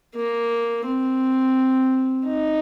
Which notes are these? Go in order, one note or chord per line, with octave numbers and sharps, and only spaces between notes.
A#3
C4
D#4